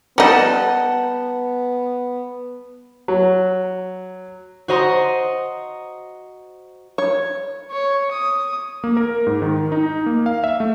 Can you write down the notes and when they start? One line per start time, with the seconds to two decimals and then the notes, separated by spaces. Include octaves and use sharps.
0.18 G3 B3 D#4 F#5 A5
3.08 F#3
4.68 F#4 C5 D#5 A#5 C6 D#6
6.98 C#5
7.71 C#5
8.12 D#6
8.84 A#3
8.97 A#4
9.27 G#2
9.42 D#3
9.72 D#4
10.06 A#3
10.26 F5
10.44 E5
10.60 A3